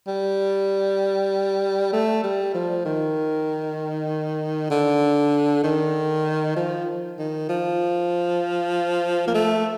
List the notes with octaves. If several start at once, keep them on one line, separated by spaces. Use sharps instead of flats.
G3
A3
G3
F3
D#3
D3
D#3
F3
D#3
F3
A#3
A3